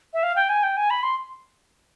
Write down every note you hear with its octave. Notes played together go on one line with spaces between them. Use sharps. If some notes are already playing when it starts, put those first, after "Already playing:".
E5
F5
G5
G#5
G5
G#5
B5
C6